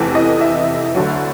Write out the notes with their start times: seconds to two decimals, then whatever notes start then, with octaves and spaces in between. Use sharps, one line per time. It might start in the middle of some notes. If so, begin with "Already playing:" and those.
Already playing: F1 E2 C3 E3 A4
0.15 D#5
0.41 E5
0.95 D2 D3 F#3